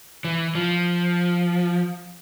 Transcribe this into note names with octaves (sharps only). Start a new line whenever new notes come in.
E3
F3